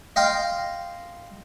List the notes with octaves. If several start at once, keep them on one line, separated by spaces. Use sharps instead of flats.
D#5 F5 G5 C6